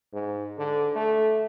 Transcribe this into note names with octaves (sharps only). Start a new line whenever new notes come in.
G#2
D3
A3